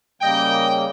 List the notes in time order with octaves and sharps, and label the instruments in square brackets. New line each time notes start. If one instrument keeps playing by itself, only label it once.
[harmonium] C#3 G3 A#3 [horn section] D#5 G5